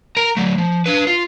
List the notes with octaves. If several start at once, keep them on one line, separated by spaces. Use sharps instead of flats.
A#4 A#5
F#3 A3
F3
D4 B4
F4